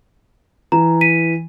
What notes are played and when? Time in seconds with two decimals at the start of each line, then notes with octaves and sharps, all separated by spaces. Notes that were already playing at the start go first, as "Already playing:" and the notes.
0.72 E3 A#5
1.01 B6 D#7